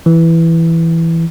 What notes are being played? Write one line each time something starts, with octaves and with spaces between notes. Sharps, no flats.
E3